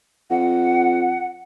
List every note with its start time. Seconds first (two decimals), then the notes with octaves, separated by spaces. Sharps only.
0.31 F2 F#5